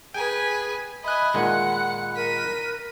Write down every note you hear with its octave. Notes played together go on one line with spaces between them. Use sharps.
G#4 B4 G5 G#5
D#5 E5 G#5 B5 F#6
A#2 D#3 G#3 F#5 C#7
A#4 B6 D#7